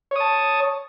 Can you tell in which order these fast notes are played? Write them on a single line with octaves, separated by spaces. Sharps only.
C#5 D#6 A5